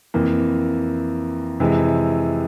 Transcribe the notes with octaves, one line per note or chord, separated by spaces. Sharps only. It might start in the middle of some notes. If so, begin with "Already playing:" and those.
F2 E3 A#3
F2 C3 E3 G#3